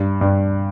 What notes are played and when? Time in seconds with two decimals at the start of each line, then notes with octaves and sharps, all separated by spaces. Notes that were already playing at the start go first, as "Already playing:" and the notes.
Already playing: G2
0.21 G2